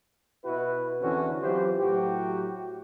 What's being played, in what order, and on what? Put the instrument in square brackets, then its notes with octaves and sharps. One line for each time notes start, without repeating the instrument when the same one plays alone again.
[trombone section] B2 E4 F#4 B4
E2 D3 E3 C4 C#4 F#4
E3 F#3 F4 G4 C5
A2 F#3 F#4 G4